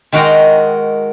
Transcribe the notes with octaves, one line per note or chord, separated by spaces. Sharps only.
D#3 G#3 F#4 G5 A#5